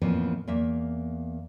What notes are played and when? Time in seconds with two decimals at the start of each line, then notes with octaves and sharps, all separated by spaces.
0.02 F2 A2 E3 F3 A#3 B3
0.47 E2 A#3 E5